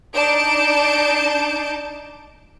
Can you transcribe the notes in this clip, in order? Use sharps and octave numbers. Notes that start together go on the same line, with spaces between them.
D4 D#4 A5 G6 D7